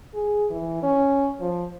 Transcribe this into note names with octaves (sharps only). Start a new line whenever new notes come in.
G#4
E3
C#4
F3